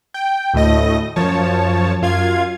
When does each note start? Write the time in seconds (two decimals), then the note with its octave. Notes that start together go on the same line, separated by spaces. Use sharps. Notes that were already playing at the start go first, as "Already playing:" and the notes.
0.14 G5
0.54 D2 A2 A3 D#5 A#6
1.16 F#2 F3 C#5 A5
2.02 F#2 F4 F5 G#6